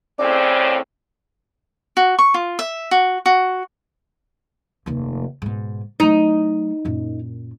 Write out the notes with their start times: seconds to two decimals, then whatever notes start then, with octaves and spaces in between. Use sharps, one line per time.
0.19 A2 C#3 C4 D5
1.97 F#4
2.19 C#6
2.34 F4
2.59 E5
2.91 F#4
3.26 F#4
4.86 F1 D#2
5.42 G#2 B2
6.00 F#3 A3 D#4
6.85 F#2 A#2